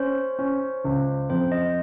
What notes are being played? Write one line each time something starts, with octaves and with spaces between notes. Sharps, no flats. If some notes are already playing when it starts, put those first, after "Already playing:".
Already playing: C#4 C5
C#4
C#2
F2 C5
D#5